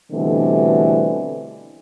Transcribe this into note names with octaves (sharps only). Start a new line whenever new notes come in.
B2 D3 E3 G3 A3 C4